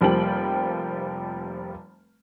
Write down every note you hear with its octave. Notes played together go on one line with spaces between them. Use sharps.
F1 F3 G3 A#3 G5 F#7